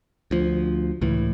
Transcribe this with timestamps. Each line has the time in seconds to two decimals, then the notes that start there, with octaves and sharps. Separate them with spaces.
0.31 D2 F3
1.02 C#2 A2 E3